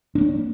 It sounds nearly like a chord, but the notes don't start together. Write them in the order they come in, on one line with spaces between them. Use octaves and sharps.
D4 C#4 A#3